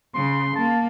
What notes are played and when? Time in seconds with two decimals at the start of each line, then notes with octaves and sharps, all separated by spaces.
0.15 C#3 C6
0.56 A#3 A5